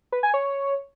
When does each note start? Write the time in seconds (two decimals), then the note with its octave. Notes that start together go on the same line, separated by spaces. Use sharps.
0.12 B4
0.23 G#5
0.34 C#5